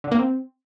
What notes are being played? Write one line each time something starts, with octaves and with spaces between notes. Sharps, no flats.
D3
A#3
C4